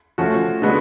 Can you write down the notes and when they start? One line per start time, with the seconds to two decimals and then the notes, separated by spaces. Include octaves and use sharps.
0.18 F3 A3 C#4 F#4
0.62 D3 G#3 B3 F#4